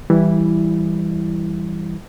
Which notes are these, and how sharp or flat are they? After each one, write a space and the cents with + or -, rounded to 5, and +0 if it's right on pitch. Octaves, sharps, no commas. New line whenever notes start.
E3 +0 G3 +0 E4 +5